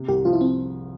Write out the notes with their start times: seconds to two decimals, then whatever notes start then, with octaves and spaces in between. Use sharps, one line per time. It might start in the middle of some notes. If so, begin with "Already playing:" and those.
Already playing: C3
0.08 C2 G4
0.25 F3 F4
0.33 E4
0.41 C4